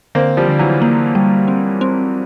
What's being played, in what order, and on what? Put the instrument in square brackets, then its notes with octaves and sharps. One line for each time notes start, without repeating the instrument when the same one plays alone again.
[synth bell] D3 [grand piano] A#3 C4
[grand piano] F3 G3
[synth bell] D3
[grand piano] E3 F#3
[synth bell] A#3
G3
C4
C4